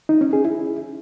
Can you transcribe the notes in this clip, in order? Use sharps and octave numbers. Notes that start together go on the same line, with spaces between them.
D#4
C#4
G#4
E4